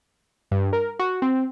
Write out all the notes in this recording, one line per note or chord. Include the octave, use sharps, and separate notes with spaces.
G2
A#4
F#4
C4